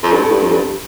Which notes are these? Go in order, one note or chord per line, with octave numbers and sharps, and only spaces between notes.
F2
G2
A2
G2
F2
G2